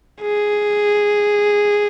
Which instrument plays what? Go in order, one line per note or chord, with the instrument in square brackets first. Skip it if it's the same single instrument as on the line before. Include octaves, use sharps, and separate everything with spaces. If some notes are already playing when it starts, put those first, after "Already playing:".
[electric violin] G#4